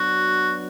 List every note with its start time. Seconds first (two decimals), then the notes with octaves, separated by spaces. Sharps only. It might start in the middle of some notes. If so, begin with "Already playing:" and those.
Already playing: F#3 B3 D4 F#4